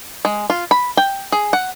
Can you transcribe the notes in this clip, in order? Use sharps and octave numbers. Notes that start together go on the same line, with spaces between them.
G#3
F4
B5
G5
G#4
F#5